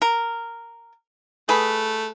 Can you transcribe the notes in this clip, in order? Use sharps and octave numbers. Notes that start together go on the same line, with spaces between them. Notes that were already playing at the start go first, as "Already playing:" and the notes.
A#4
A3 G#4 B4